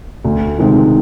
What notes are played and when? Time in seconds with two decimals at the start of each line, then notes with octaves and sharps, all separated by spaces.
0.24 D2
0.59 C3 D#3 G#3 C4